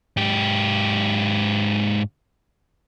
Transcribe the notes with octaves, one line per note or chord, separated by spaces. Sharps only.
G#2 G4